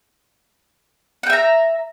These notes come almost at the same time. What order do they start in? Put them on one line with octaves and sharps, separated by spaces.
F#5 G5 E5 A#5